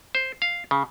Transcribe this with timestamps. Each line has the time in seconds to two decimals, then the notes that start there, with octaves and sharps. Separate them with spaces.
0.15 C5
0.42 F5
0.71 C#3